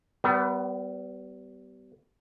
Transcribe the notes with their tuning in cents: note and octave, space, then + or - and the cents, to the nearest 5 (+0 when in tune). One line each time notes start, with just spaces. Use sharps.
G3 -30 B3 +25 B4 -45